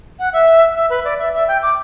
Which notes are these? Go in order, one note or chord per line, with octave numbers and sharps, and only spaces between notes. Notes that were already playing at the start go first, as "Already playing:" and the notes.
F#5
E5
E5
B4
D5
E5
E5
G5
D6